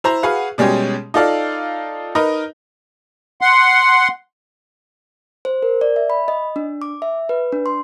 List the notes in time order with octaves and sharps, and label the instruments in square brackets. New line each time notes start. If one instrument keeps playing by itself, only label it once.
[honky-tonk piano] E4 C5 A#5
F#4 G#4 B4 F5 F#5
B2 G3 G#3 C#4 G4 G#4
D#4 F4 A4 D5 F5
D#4 A#4 B4 D#5
[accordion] F#5 C6
[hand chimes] C5
A#4
D5
E5
B5
D#5
D4
D6
E5
B4
D4
C6